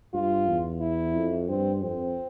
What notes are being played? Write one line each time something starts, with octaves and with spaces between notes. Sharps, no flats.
G2 F4
E2
E4
F2
G2 C4
F2 C4